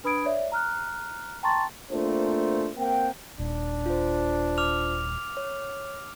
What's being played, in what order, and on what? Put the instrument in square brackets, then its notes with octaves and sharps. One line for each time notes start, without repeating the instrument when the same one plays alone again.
[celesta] D4 B4 B5 D#6 G#6 D7
C#5 D5 E5
A#5 F6 F#6
G5 A5 A#5 C6 C#6 A6
[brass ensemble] A3 A#3 C4 D4 F4 C5
A#3 C4 A#4 F#5 G5
[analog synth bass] D#1 [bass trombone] D4
[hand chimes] F4 C5
[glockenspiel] D6 F6 F7
[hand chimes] C#5